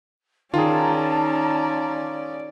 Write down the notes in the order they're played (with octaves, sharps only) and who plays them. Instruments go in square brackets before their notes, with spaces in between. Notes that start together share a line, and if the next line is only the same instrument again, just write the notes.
[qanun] D#3 [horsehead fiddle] C#4 D5 [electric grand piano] F4 G#4 [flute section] A5 A#5